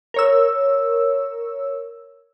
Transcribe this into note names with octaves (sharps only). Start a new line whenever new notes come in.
A#4 C#5 E6